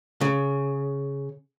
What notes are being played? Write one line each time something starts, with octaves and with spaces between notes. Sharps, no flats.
C#3